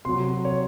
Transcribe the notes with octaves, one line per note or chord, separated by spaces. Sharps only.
C3 F#3 C6
C#5